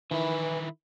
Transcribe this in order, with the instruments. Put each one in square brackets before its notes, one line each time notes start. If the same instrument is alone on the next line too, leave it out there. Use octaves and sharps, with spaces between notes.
[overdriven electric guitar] D#3 E4 [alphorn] E3